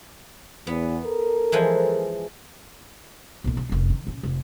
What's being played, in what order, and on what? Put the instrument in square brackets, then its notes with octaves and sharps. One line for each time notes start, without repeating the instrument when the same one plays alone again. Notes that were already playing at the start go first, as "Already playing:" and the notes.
[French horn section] E2 [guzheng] B3
[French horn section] A4 A#4
[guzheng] E3 F3 G#3
[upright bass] B1 A#3
B1
F1 F#2
D#3
A2 C#4
F1